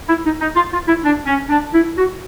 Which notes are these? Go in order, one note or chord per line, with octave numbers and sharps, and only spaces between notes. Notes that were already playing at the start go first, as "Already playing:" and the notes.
E4
D#4
D#4
F4
F4
E4
D4
C#4
D4
E4
F#4